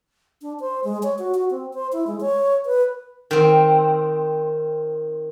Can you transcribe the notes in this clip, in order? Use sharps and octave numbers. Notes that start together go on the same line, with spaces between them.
D4
C5
G#3
C#5
F#4
F#4
C4
C5
E4
G#3
C#5
B4
D#3 C4